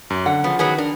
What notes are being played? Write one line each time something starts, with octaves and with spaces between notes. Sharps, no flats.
F#2
D3 F#5
C#3 F3 B3
D#3 F#3 B3 G#4
D4 A#4